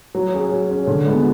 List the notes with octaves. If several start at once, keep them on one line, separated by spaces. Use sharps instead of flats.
F#3
C#4 G#4
F#3
C#4 G#4
D3
G#3 B3 F4 A4